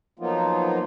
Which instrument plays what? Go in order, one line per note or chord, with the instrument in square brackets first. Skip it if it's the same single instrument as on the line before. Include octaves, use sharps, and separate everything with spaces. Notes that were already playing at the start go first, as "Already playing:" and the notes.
[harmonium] F3 F#3 A#3 B3 D#4 F4